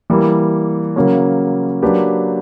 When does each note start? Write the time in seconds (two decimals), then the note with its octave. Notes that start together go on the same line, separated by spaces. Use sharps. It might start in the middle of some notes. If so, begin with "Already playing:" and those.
0.10 E3 G3 A#3
0.96 C#3 F#3 A#3 C#4
1.82 F#3 A#3 D4 G4 B4